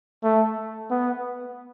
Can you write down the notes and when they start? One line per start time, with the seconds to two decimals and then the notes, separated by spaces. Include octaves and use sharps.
0.23 A3
0.90 B3